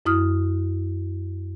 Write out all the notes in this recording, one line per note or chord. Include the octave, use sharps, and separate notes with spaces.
F#2 E4 D#6 F6